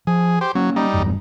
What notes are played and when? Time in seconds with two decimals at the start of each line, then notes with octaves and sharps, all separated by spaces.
0.07 F3 G#4
0.41 G4 C5
0.55 F#3 A#3 C#4
0.76 G3 D#4
0.94 E1 E2 G2